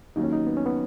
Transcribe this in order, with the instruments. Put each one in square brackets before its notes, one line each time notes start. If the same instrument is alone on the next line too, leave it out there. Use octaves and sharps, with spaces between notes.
[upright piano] D#2 D#3 F#3 A#3 [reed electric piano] D#4
[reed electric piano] C#4
D#4
B3
C#4
B3